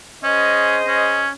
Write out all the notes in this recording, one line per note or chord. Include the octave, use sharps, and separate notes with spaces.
C#4 G#4 C5 D#5
C#4